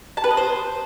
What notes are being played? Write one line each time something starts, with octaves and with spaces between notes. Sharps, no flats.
A5
B4
D#5
C5